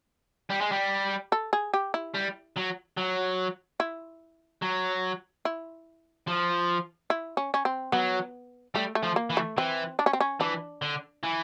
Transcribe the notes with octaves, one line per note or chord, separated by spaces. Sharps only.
G3
G#3
G3
A4
G#4
G4
E4
G3
F#3
F#3
E4
F#3
E4
F3
E4
C#4
C#4
C4
F#3 B3
G3 A3
A3
F3
A#3
E3
A3
E3 C4
D4
C#4
C4
C#4
E3 D4
D3
E3